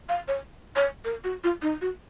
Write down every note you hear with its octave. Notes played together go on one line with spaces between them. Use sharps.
F5
C#5
C#5
A#4
F#4
F4
D#4
F#4